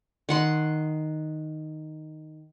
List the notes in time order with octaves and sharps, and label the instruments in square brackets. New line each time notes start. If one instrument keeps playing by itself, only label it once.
[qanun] D#3 F#5 C6